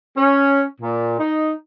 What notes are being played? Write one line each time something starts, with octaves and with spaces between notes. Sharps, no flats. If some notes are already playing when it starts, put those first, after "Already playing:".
C#4
A#2
D#4